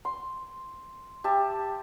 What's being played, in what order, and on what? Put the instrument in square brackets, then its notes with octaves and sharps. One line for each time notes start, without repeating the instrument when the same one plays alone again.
[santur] C6
G4 E5 A5